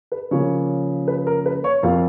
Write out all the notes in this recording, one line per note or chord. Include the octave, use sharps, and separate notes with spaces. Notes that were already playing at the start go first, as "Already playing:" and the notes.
B4
C#3 F3 A#3 C#5
B4
A#4
B4
C#5
F2 F3 A#3 F4 F5